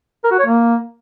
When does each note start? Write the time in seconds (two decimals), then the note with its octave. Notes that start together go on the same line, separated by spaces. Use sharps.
0.24 A#4
0.31 F#4
0.39 C#5
0.46 A#3